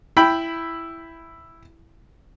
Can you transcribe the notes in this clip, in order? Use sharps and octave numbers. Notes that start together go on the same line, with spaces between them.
E4 G5 B5